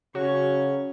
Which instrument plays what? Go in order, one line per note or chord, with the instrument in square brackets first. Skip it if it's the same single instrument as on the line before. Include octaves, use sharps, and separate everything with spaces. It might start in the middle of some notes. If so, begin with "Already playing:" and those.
[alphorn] C#3 [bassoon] F#3 [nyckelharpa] C#4 C#6 [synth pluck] F#4